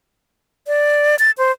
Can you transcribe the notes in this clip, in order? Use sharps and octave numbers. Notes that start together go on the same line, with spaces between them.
D5
A6
C5